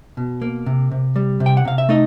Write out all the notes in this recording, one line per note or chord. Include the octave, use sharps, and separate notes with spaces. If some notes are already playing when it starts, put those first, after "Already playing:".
B2
A#3
C3
C3
G3
C3
G5
F#5
C3 F5
E5
A3 D#4 D#5